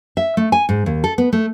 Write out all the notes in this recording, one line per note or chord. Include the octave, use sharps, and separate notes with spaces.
E5
A3
G#5
G#2
D#2
A4
B3
A3